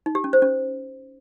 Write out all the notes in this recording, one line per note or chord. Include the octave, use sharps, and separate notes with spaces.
D#4
G4
C#4
C5
C#4